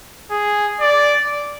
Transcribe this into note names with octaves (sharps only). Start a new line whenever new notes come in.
G#4
D5